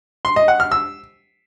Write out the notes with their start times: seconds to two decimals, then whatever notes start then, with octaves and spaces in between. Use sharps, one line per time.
0.25 C6
0.36 D#5
0.48 F#5
0.60 F6
0.71 E6